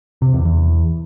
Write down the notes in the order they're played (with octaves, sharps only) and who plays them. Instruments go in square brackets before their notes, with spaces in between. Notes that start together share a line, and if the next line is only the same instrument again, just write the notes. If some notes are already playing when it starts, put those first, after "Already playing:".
[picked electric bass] C3
E2
E2